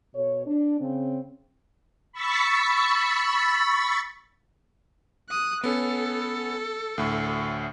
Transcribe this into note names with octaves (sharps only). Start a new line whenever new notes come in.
B2 A4 C#5
D4
C#3 C4
B5 C#6 E6 A6 B6 C#7
D#6 F#6
B3 C#4 A4
D2 A2